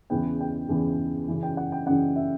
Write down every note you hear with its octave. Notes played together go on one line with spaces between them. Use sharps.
E2 C#3 E3 B3 G5
G5
E2 C#3 E3 B3
F#2 C#3 E3
G5
F#5
G5
F#2 C#3 E3 F#5
E5